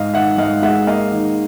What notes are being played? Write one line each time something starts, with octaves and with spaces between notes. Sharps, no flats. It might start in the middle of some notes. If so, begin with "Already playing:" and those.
Already playing: G#2 D#5 F5
D#3 E5 F#5
G#2 D#5 F5
G#3 E5 F#5
A#3 D#5 F5
D#3